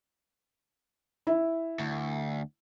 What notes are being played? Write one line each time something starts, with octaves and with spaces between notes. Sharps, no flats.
E4
D2